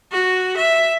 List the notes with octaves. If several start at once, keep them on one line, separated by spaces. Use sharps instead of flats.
F#4
E5